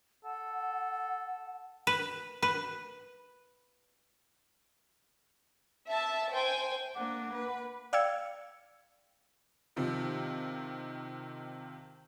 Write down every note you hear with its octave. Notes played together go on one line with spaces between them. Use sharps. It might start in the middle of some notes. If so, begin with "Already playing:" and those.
A4 F#5
B4
B4
E5 A5
C5 G5 G#5
A#3 D4 F#5 D6
B4
D5 F5 G5 E6 G#6 C#7
C3 D#3 F3